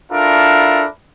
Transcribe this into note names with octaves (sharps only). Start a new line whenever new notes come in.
D4 E4 F4 A4 A#4